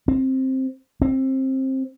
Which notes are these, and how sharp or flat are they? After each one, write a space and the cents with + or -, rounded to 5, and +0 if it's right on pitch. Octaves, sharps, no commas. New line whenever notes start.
C4 +10
C4 +20